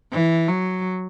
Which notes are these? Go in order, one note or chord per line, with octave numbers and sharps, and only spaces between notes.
E3
F#3